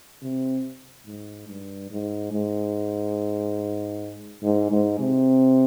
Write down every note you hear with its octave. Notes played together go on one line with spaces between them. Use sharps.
C3
G#2
G2
G#2
G#2
G#2
G#2
C3